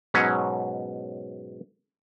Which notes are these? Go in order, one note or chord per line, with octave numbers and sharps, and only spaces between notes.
G#2 B2 F#3 C#4